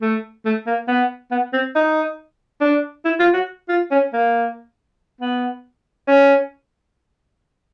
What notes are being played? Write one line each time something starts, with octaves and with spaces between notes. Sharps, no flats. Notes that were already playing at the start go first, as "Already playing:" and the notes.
A3
A3
A#3
B3
B3
C4
D#4
D4
E4
F4
F#4
F4
C#4
A#3
B3
C#4